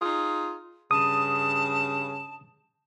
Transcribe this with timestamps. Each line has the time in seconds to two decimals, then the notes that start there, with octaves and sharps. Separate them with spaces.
0.02 D#4 F4 G#4
0.91 G2 C#3 A5 D#6